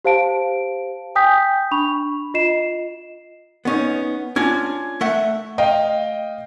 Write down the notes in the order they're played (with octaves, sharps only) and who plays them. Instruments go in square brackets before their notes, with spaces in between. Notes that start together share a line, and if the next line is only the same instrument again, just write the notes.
[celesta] G4 C5 F5 A5 D7
G5 G#5 D#6 G6 B6
D4 B5 C#6 F7
F4 D#5 C7 E7
[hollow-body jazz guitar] B3 C#4 D#4
[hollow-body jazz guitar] C#4 D4 F4 [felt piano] G#6
[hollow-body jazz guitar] A3 E5 F#5
[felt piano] D#5 F5 G5